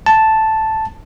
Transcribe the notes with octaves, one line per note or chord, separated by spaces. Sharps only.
A5